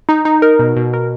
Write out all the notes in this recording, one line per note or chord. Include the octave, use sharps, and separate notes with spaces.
D#4
D#4
A#4
B2
B2
A#4